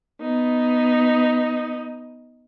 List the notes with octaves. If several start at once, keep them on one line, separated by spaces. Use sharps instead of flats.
B3 D#4